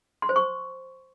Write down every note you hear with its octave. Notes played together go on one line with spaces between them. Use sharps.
C6
C5
C#6